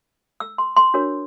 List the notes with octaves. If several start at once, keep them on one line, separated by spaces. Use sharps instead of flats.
E6
C6
C6
D4 F#4 A#4 C#5